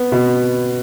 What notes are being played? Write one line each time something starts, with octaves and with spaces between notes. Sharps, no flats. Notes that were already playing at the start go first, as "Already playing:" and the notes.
Already playing: B3
B2